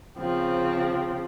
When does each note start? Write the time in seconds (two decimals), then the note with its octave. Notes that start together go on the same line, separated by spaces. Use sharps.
0.17 C#3 F3 C4